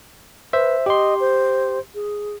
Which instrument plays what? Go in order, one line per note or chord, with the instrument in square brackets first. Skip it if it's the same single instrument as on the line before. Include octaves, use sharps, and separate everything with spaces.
[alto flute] B4 [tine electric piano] C5 E5
[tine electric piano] G4 C6 [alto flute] D#5
[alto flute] C5
G#4